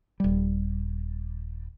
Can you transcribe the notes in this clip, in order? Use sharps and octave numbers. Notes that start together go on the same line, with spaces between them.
D#1 G3